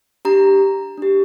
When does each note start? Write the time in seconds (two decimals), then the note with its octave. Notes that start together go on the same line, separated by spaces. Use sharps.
0.25 D4 G4 A#5
0.98 D4 G4